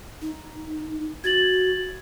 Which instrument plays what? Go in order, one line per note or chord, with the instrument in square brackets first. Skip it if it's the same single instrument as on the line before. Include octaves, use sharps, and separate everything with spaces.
[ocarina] D#4
[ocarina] F#4 [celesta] G#6 A6 F#7